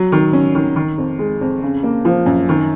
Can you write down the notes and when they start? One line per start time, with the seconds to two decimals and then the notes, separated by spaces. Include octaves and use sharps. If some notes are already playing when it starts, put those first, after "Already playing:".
Already playing: F#3
0.12 D#3
0.33 C#4
0.55 D#3
0.76 D#3
0.98 F2
1.19 G#3
1.41 F2
1.63 C#3
1.83 A#3
2.05 F3
2.26 F#2
2.49 D#3